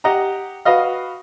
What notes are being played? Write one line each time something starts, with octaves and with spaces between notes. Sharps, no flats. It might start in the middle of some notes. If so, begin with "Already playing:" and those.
G4 D#5 F#5 A#5
F#4 B4 D#5 F5